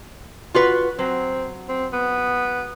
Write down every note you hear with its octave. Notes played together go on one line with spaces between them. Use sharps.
F4 F#4 B4
F#3 C4
C4
B3